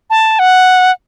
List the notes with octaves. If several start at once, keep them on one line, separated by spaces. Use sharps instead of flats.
A5
F#5